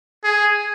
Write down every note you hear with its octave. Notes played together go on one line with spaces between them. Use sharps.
G#4